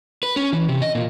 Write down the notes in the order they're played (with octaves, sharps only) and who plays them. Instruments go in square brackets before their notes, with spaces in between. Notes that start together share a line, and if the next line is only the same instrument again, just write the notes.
[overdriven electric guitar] B4
C#4
E3
C3
D#5
A#2